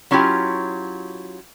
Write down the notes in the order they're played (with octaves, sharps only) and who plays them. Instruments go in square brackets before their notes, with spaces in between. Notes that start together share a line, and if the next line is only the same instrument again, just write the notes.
[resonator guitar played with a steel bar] F#3 C#4 E4 F4 G4